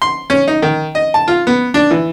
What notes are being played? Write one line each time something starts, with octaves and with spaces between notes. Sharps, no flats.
C6
C#4
D#4
D#3
D#5
A5
F4
B3
D4
E3